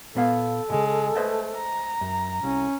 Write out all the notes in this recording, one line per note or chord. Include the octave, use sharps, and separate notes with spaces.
A#2 B3 A4 F5
A#2 C#3 G#3
A3 B4 C5 D#5
A#5
F#2
C2 C#4